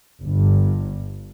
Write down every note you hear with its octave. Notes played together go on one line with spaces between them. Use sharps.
G1 G2